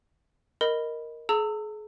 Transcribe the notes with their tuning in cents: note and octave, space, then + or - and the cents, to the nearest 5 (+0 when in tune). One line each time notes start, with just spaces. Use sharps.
A#4 +0 D#5 +0 B5 +0
G#4 +40 A#5 -45 E6 +0